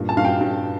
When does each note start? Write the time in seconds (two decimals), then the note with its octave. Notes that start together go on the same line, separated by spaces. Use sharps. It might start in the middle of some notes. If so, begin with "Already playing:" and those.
Already playing: G2 A#2
0.09 A5
0.17 G2 F5
0.25 G5
0.41 G2